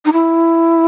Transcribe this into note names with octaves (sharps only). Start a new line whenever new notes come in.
D#4
E4